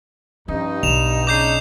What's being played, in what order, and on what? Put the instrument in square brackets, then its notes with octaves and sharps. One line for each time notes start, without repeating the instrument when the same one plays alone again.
[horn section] G2 D#4 [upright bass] F3 C#4
[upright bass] B1 [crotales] E7 F7
[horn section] C#3 D4 D#4 [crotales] D6 G6 C7